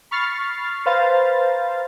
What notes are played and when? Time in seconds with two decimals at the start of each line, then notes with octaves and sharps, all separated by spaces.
0.11 B5 C#6 F6 A6 C7
0.86 B4 C5 F5 A#5 A6